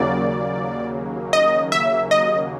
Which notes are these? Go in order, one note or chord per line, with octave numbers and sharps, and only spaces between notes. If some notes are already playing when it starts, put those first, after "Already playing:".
Already playing: D#2 C#3 F#3 A#3 D5
D#5
E5
D#5